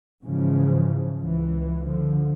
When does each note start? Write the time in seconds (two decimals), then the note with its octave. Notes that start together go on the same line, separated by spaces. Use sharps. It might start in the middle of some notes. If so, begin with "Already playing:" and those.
0.23 G#2 C#3 E3 F3
1.20 C#2 E3
1.82 D3 F3